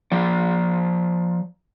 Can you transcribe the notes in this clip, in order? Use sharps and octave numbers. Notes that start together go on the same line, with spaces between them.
F3 D5